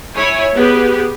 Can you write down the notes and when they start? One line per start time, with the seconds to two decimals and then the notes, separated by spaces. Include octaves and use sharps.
0.15 E4 C#5 G#5
0.54 B3 G4 G#4 B4